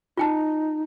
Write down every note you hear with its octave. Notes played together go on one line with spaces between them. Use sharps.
D#4 F4 G5 A5